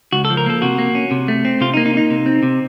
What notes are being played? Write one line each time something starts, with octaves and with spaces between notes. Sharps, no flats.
C#2 F#4
A4
F3
A#4
A#3 A4
C3 F#4
A#3
C#4
C3
A3
C4
C3 F4
D#4
A#3
D#4
C#4
D#4
C3
C4
C3